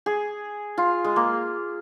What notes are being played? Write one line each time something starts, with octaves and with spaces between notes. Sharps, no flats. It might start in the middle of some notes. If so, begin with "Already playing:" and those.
G#4
F4
G#3
A#3